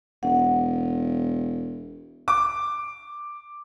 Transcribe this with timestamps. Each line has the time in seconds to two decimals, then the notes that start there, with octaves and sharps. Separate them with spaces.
0.23 E1 F#5
2.28 D6